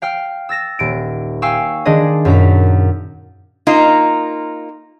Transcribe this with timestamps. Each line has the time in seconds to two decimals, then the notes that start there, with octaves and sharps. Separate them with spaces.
0.02 F5 G5 F6
0.49 E6 A6 A#6 E7
0.79 D#1 D7
1.42 F5 G5 G#5 C#6 E6
1.85 D#3 G#3 D4 G#4 D5 D#5
2.25 F#2 A#2 A#5 B6
3.67 A#3 D#4 F4